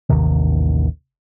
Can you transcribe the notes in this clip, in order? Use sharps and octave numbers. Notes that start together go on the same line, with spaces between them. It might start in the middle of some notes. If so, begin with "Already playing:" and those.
A1 D#2 C3 D#3